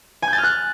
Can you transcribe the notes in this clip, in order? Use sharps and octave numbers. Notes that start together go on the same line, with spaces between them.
G#5
G6
A6
F6
F#6